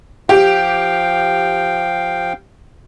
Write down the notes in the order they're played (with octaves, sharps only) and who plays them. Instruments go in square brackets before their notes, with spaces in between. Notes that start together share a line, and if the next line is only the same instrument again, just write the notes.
[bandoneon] F3 F5 G5 [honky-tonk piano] G4